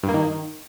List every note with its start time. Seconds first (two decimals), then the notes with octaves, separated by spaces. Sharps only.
0.03 G2
0.09 A#3
0.14 D#3